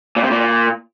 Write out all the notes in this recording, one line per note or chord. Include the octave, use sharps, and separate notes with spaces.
A#2
C3
A#2